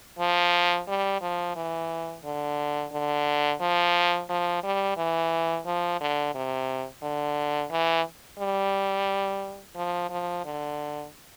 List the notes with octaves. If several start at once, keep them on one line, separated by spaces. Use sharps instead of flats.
F3
G3
F3
E3
D3
D3
F3
F3
G3
E3
F3
D3
C3
D3
E3
G3
F3
F3
D3